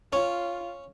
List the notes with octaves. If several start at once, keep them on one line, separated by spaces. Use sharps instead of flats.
C#4 F4 C#5